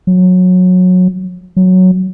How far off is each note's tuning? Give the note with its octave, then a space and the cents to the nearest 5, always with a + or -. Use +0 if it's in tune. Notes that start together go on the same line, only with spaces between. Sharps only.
F#3 -20
F#3 +0